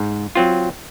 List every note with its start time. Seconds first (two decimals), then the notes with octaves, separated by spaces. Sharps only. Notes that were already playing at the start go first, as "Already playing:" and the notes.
Already playing: G#2
0.35 F#3 C4 F4